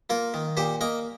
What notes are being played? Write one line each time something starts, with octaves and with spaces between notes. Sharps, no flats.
A#3 F4 A#4
D#3
A#2 G4 C5
A#3 A#4 D#5